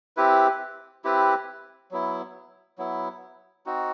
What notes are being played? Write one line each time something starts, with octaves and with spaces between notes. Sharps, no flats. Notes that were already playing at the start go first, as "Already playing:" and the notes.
C4 E4 G4 B4
C4 E4 G4 B4
F#3 B3 E4
F#3 B3 E4
C4 D#4 F#4